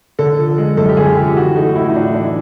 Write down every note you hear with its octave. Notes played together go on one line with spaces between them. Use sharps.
D3 A4
F3
G#3
F#2 A4
G4
D3 G#4
F3 G4
E3 F#4
A3 D#4
A2 E4
D#4
A2 D4
E3 D4